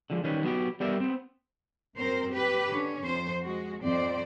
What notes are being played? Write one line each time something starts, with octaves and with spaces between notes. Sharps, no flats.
D3 F3 G#3
D#3 G3 C#4 B4
F#3 B3 F#4 G4
G3 B3 G4 A#4 D5 E5
B3 C4
F#2 C4 A#4 C5
G4 B4
D3 C#4
F2 C5
G#3 F#4
F2 C4 C5 D5